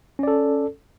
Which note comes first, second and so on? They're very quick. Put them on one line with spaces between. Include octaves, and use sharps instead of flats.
C#4 D5 A4